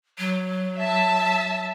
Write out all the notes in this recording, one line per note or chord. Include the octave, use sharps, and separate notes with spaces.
F#3
E5 A5